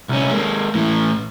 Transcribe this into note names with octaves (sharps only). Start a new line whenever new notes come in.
C2 C#4
G#3 A#3
A2 E3